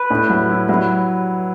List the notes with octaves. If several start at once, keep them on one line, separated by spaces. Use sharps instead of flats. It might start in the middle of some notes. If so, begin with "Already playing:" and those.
Already playing: B4
A2
F#3
E4
F#3